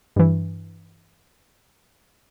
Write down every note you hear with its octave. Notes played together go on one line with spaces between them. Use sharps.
G2 E3